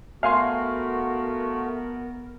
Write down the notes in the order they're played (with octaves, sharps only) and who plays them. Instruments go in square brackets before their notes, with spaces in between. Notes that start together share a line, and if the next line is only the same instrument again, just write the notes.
[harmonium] A3 F#4 [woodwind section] B3 A#4 [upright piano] F5 G#5 C6